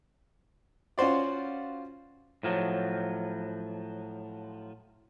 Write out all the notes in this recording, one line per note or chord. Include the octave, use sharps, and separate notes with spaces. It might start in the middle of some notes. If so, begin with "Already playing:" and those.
C#4 F4 F#4 C5 D5
A2 F3 F#3